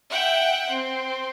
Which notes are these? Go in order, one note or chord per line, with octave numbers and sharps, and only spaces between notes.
E5 F#5 G5
C4